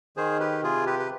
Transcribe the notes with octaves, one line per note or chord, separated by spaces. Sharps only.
D#3 G#4 C5
G4 B4
C3 F4 G#4
G4 B4
B4